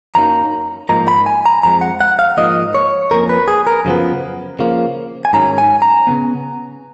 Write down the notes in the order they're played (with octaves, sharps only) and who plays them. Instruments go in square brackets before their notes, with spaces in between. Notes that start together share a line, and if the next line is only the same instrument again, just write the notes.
[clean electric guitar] F#2 D#3 F#3 A#3 D#4 A#5
G#2 F3 A#3 D#4 A#5
B5
G#5
A#5
F2 C#3 F3 G#3 A#5
F#5
F#5
F5
G#2 F3 A#3 D#5
C#5
F2 F3 A#3 C#4 A#4
B4
G#4
A#4
F#2 C#3 F3 B3
C#3 F3 A#3
G#5
G#2 D#3 F#3 C#4 A#5
G#5
A#5
C#3 F3 B3